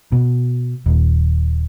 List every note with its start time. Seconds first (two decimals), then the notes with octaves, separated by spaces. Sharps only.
0.12 B2
0.86 D#1